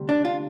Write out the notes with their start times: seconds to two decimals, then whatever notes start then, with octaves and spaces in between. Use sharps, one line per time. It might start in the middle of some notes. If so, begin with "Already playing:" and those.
Already playing: D2 C3 G3
0.09 D4
0.25 F4